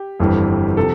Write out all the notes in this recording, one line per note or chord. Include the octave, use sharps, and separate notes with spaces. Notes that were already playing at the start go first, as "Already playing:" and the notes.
Already playing: G4
G1 F2 E3 G3
C3 F3 A4